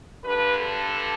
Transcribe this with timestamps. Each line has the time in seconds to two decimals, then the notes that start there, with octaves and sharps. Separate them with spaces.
0.24 G2 D3 B4
0.58 A4